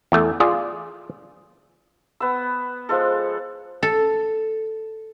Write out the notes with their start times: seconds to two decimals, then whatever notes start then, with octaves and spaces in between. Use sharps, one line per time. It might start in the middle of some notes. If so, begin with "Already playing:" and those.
0.12 E2 A3
0.40 F4 G#4 D5
2.20 B3 E6
2.89 F3 G#3 A4
3.83 A4